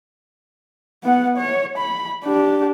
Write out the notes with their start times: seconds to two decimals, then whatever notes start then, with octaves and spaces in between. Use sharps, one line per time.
1.04 B3 F#5
1.38 C#5
1.78 B5
2.24 D4 G4